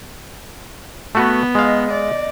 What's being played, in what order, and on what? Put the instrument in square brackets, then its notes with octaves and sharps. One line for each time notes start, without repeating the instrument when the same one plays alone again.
[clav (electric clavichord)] A3 F#4 B4 [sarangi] B3
[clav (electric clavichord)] G#3 F5 [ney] D#5
[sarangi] D5